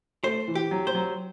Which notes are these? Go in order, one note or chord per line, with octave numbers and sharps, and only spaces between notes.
A3 C5
E3
G4
F#3
C5
F#3